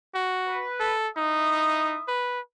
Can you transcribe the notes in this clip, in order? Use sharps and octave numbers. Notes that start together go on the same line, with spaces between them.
F#4
B4
A4
D#4 E4 E5 D#6
B4